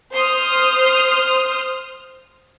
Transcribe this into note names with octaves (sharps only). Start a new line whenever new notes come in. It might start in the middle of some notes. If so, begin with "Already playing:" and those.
C5 C6 D#6 F6